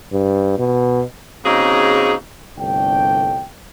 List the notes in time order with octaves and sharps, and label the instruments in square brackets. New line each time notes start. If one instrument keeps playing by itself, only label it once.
[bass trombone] G2
B2
[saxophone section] C#3 A#3 C4 D#4 F#4 G#4
[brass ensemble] G1 C2 A3 D4 G5